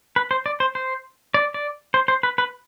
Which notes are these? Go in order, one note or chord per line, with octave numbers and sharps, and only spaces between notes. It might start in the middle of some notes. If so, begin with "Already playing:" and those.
B4
C5
D5
C5
C5
D5
D5
C5
C5
B4
B4